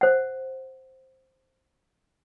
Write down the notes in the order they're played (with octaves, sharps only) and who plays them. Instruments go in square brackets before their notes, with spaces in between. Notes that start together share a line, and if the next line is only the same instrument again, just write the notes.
[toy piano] C5 F#5